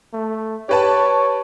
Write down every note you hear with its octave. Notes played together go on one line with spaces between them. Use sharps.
A3
G4 B4 C#5 A5